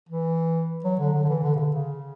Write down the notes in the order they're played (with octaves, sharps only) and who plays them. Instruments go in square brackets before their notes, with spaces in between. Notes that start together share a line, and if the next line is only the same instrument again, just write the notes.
[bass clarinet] E3
F#3
D3
D3
D3
E3
D3
C#3
D3
C#3